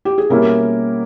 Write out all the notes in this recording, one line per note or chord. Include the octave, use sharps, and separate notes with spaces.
G4
G#4
B2 G3 A#3 C#4 E4 A#4